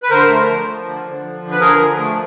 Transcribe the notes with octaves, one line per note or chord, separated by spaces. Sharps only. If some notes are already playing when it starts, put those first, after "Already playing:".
B4
D3 A#4 C5
A3
F3
F3
D3
D3
F3
D3
B4
D3 G#4 A#4
F3
A3